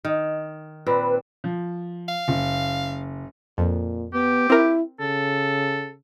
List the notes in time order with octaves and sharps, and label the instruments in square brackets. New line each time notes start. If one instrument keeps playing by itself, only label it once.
[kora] D#3
[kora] A#2 C4 [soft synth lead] B4
[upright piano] F3
[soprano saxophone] F5
[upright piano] F#1
[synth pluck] F2 [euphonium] A#2
[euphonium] B3 [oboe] G4
[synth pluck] C4 A#4 [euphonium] E4
[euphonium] C#3 [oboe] A4